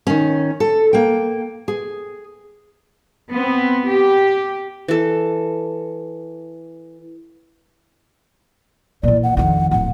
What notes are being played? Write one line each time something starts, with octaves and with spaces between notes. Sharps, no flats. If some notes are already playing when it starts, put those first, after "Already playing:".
D#3 C#4
A4
A#3 G5
G#4
B3 C4
G4
E3 A4
A#2 E3 D5
F#5
F2 D#3 F#5
D1 A#1 F#5